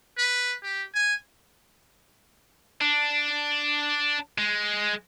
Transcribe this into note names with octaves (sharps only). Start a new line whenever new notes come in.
B4
G4
G#5
D4
G#3